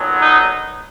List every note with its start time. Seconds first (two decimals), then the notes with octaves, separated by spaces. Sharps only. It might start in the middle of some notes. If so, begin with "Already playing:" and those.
Already playing: B1 A#2 F#3 B3
0.21 D#4